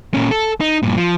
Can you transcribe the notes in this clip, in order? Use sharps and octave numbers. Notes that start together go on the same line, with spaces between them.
A#2 C#4
A4
D#4
G2 A#2
F3